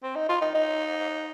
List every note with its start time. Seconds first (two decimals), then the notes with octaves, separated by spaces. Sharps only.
0.03 C4
0.15 D#4
0.29 F4
0.41 D#4
0.54 D#4